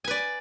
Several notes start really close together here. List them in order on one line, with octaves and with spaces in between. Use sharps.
G#5 B4 D5